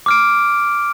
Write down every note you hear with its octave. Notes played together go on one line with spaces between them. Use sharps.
D6 F6 D7